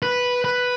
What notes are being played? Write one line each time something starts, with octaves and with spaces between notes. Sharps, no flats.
B4
B4